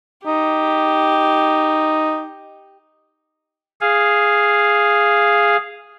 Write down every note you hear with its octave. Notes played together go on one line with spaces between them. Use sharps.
D#4 G4
G#4 F5